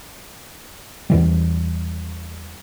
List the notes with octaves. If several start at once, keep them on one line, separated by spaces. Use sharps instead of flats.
E2 E3 G3